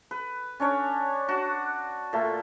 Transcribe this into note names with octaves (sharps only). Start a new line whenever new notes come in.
B4
C#4 D4 C#5
D4 F#4
A#2 A3